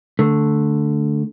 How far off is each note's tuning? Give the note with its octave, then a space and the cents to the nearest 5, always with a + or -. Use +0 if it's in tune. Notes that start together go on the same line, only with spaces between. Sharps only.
D3 +0 A3 +0